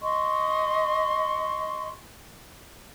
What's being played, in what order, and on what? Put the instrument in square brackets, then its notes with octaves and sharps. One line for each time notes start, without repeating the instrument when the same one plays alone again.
[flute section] D#5 C6 C#6